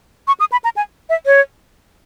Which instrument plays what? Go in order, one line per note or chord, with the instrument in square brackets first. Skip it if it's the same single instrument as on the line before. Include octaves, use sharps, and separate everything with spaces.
[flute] C#6
D#6
B5
A#5
G#5
E5
C#5